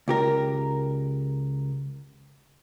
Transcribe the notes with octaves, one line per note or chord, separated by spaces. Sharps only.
C#2 G4 A#4